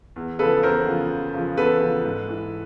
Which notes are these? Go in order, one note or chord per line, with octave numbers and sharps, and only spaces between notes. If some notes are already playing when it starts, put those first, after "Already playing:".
E2
C#3 F3 A4 B4
E2 A#4 C5
C#3 F3
E2
C#3 F3
E2 A4 B4
C#3 F3
G#2
E3